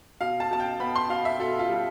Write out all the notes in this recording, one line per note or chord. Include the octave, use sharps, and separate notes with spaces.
B2 F5
A5
B2 A5
G5
B3 B5
C6
B2 F5
E5
B2 A4
F4
G3